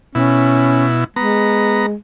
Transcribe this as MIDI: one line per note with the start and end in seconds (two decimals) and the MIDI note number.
0.15 1.04 47
0.15 0.86 61
0.15 1.04 64
1.16 1.94 56
1.16 1.86 59
1.16 1.86 82